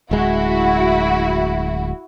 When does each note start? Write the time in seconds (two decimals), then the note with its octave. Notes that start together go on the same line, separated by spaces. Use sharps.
0.11 D1 G#3 E4 F#4